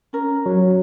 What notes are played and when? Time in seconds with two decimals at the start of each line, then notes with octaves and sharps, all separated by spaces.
0.13 C#4 A#4
0.46 F#3